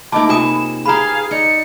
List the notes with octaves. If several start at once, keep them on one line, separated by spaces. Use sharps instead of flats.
A3 A#3 D#4 D#5 A5 B5 D6
C3 F4 G#4 G#5 C#6 D#6 E7
G4 G#4 B4 F5 A#5 B5
D#4 D5 C#7